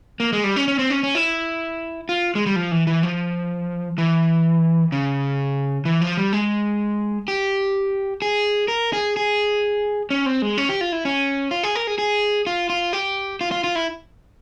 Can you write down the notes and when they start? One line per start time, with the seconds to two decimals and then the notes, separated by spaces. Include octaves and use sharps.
0.20 A#3
0.33 G#3
0.44 G3
0.56 C#4
0.68 C#4
0.79 C4
0.90 C#4
1.03 C#4
1.15 E4
2.09 F4
2.35 G#3
2.46 G3
2.56 F3
2.71 E3
2.87 E3
3.03 F3
3.98 E3
4.92 C#3
5.85 E3
6.01 F3
6.17 G3
6.33 G#3
7.28 G4
8.22 G#4
8.68 A#4
8.93 G#4
9.17 G#4
10.10 C#4
10.26 C4
10.42 G#3
10.58 C#4
10.69 G4
10.81 F4
10.92 E4
11.05 C#4
11.51 F4
11.63 G#4
11.75 A#4
11.87 G#4
11.98 G#4
12.47 F4
12.70 F4
12.93 G4
13.41 F4
13.51 F4
13.64 F4
13.75 E4